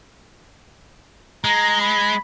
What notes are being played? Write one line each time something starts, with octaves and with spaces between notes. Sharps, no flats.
G#3 A#5
B5